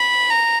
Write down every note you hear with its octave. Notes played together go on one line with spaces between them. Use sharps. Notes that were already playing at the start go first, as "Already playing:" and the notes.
Already playing: B5
A#5